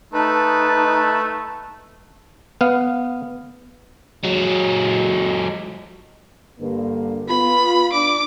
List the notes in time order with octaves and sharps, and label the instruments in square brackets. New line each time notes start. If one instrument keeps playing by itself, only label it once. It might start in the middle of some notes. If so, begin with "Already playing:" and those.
[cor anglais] A3 [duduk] D#4 [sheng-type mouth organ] B4 [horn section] A5
[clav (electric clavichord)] B3 F5
[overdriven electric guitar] F#3 G#3
[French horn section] G2 D3 A#3
[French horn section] B3 F4 [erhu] B5
[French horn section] D4 [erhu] D6